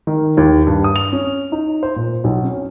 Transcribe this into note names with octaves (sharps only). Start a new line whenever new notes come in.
D#3
D#2
G2
D#6
F7
C#4
D#4
C5
A#2
B1
C#4